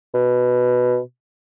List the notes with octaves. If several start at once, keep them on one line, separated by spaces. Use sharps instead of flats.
B2